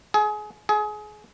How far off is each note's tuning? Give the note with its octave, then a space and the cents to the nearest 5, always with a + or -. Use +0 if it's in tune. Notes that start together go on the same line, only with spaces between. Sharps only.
G#4 +25
G#4 +25